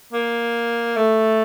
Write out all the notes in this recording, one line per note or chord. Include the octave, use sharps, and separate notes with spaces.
A#3
A3